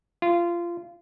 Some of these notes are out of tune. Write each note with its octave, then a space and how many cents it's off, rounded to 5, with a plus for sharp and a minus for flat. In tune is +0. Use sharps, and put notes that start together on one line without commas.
F4 -20